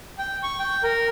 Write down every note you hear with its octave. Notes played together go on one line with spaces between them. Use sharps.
G5
C#6
G5
A#4